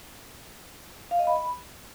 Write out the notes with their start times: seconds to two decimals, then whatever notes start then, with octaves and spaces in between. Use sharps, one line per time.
1.11 F5
1.19 D#5
1.27 B5